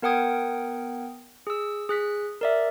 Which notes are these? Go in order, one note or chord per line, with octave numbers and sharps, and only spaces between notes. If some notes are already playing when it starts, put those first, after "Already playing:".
B3 A#4 F#5 G5 D#6 G#6
G#4 E6
G#4 F#6 B6
A#4 D5 E5